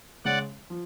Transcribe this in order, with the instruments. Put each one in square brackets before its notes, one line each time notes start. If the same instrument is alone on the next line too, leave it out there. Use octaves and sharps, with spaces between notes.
[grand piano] C#3 G#3 C#4 [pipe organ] D5 F#5
[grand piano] F3